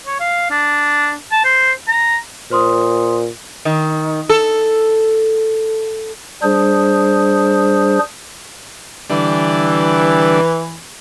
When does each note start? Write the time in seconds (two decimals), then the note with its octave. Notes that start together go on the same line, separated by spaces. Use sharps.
0.07 C#5
0.20 F5
0.51 D4
1.31 A5
1.45 C5
1.88 A#5
2.51 A#2 C5 C6 D#6
3.65 D#3
4.29 A4
6.43 G3 D4 G#4 C5
9.10 D3 E3 G3 D4